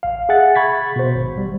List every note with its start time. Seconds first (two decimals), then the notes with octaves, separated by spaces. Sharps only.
0.03 A1 F5
0.29 G#4 E5 F#5 A6
0.55 B5 C#6 G#6 A6 B6
0.96 B2 C5
1.15 G#1
1.38 G3